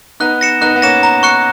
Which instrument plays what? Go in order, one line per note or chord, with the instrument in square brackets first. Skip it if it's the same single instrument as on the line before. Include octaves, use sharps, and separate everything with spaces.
[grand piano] B3 D#4 [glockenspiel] F#6
[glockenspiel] A#6 C#7 E7
[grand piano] B3 D#4 [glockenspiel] F#6
[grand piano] B3
[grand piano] A#3 C#4 [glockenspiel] A#6 C#7 E7
[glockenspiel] A#5
C#6 F#6 C#7